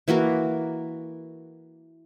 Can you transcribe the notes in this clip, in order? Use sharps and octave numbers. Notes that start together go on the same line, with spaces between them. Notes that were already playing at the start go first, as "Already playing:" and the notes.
E3 A#3 F#4 A#4